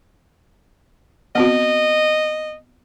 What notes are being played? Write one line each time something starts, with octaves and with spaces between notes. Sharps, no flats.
B3 C4 F#4 D#5